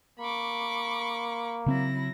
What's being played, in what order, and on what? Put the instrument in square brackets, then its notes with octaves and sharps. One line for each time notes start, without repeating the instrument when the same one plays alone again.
[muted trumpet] A#3 [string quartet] B5 C#6 D6
[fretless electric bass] C#3 C4 [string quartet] F#3 E4 A#6